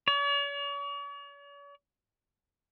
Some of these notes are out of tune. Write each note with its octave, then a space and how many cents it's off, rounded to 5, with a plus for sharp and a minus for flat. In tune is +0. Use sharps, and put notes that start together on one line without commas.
C#5 +45